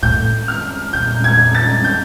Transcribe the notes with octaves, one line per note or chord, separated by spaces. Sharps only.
A2 G6
F6
A#2 G6
G#6
A6
G6